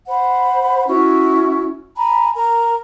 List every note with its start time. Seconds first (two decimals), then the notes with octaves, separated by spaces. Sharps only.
0.07 C5 F#5 B5
0.87 C#4 E4 F#4
1.97 G#5 A#5 B5
2.35 A#4 A#5